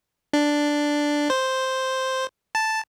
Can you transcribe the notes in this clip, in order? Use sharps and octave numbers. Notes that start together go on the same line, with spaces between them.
D4
C5
A5